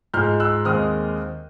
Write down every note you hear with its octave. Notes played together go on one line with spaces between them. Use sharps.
G#2 F3 G#3 F6 G6
E6 F#6
D#2 D#3 G#3 C4 D#6 F6